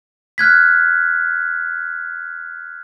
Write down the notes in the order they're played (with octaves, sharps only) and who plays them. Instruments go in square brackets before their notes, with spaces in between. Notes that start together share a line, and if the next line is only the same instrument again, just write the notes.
[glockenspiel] F6 F#6 G#6 B6